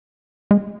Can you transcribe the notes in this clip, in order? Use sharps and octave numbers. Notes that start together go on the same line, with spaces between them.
G#3